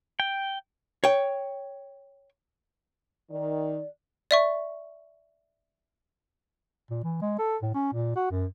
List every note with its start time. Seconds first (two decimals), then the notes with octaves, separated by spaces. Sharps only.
0.20 G5
1.04 C#5 G5
3.30 D#3 D5
4.31 D5 E5 C#6
6.90 A#2
7.04 E3
7.22 G#3
7.39 A4
7.62 A2
7.75 C#4
7.93 A#2
8.16 F#4
8.31 F#2